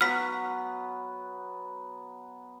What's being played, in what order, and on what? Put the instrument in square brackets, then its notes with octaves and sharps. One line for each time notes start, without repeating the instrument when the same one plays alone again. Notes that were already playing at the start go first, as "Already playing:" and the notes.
[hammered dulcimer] F#3 B3 [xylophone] F6 B6